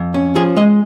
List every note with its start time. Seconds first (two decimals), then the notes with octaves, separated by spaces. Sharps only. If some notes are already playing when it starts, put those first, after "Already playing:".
Already playing: F2
0.14 C#4
0.35 F3 G#4
0.56 G#3 D#5